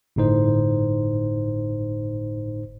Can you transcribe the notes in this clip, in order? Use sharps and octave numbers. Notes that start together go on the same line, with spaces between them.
G1 A2 D#4 C5